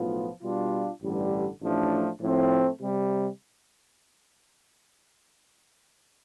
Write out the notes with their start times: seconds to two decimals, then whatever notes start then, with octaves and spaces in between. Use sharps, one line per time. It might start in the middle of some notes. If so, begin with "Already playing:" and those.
Already playing: B1 A2 F3 B3 F4
0.42 B2 G3 D4 F4
1.02 A1 G2 D3 G3
1.61 A1 A2 F3 A3 D4
2.21 A2 F3 A3 C4
2.81 C3 G3